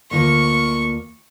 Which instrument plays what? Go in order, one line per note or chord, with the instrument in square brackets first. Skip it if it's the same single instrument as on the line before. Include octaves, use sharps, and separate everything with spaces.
[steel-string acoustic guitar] D2 A#3 F4 [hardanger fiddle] C#6